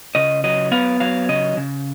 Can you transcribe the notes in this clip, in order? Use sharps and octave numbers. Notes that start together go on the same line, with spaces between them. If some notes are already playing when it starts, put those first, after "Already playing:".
C#3 D#5
F#3 D#5
B3 F5
F#3 F5
C#3 D#5
C#3